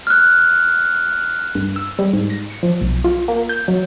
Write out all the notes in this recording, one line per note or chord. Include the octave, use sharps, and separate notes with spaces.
F6 F#6
G2
E6
G3
G#2
A#6
C#7
F3
B1
F4
A#3
G6
F#3